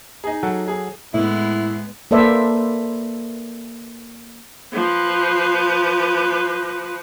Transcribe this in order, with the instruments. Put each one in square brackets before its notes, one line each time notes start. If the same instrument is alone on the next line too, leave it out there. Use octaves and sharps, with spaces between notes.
[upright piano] D#4 G#4
[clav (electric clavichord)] F#3 A4 F#5
[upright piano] G#4
[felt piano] A2 [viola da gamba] G#3 B3 [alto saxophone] E4
[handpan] A#3 A4 B4 C5 D5 E5
[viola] F3 B4